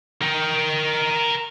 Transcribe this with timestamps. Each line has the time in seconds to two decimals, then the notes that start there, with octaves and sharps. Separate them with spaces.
0.22 A#4 G5